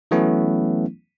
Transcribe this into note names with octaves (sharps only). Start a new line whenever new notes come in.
E3 F#3 A3 B3 C#4 E4